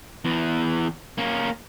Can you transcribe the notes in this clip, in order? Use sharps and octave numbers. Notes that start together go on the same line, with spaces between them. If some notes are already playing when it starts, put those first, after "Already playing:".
E2 E3
A#3 C#4